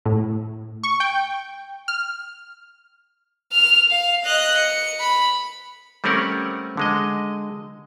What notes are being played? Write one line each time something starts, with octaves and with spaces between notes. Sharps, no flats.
A2
C#6
G5
F6
F6 F7
F5
D#5 F#6
C#7
B5
G3 A3 C4 C#4 A#4 F#5
D3 G#3 D#5